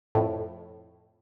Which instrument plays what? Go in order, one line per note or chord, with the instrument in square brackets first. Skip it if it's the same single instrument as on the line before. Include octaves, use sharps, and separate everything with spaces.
[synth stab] F2 A2